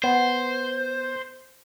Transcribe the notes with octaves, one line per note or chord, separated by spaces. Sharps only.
B3 C5